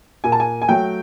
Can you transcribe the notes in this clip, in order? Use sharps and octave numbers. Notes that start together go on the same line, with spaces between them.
A#2 G#5
A5
G#5
G#5
F#3 A3 G5